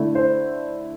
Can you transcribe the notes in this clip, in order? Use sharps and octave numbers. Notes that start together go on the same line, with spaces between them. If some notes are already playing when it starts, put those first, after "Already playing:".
Already playing: D3 A3 E4
C5